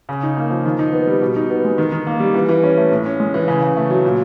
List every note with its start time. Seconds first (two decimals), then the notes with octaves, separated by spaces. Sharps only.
0.09 C#3
0.23 D#4
0.37 A#3
0.50 F3
0.65 D#3
0.79 D#4
0.93 B3
1.07 G3
1.22 B2
1.36 D#4
1.50 B3
1.64 G#3
1.78 D#3
1.92 D#3
2.07 A#3
2.20 G3
2.34 E3
2.49 E3
2.64 C#4
2.77 A3
2.92 A2
3.06 C#4
3.20 G#3
3.34 E3
3.48 C#3
3.62 C#3
3.77 A3
3.90 F#3
4.04 A#2